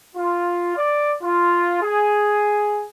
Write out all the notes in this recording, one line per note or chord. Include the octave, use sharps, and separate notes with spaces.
F4
D5
F4
G#4